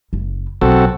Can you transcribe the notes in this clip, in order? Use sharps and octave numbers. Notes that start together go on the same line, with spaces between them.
F#1
B1 C4 F#4 A4